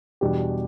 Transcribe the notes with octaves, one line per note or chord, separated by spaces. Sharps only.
E2 B2 G3 D4 G4